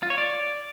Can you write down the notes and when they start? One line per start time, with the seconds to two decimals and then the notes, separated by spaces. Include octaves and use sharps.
0.03 F4
0.10 C#5
0.18 D5